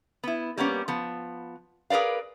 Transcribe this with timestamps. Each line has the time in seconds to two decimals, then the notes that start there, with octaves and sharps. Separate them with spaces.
0.23 B3 E4
0.58 G3 A#3 B3 C#4
0.88 F3 B3
1.90 G#4 A#4 B4 D5 F5